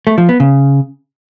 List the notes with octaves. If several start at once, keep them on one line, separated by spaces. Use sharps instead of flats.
A3
F3
B3
C#3